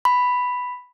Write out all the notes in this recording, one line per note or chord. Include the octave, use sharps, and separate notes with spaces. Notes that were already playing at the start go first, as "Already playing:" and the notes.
B5